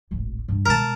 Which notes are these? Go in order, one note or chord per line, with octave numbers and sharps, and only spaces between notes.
D1 G#1
G2
B2 G#3 A#4 A5